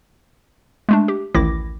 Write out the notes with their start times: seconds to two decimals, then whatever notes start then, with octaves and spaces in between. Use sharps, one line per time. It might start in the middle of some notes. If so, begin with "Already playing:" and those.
0.89 G#3 A3 D4
1.08 G4
1.35 A1 D2 D#3 E4 D6 A#6